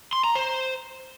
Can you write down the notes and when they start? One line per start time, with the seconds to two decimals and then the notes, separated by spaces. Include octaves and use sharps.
0.13 C6
0.24 A#5
0.35 C5